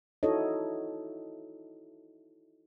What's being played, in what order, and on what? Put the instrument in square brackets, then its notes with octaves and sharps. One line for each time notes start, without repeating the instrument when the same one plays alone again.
[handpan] D#4 E4 F#4 A4 C#5 D#5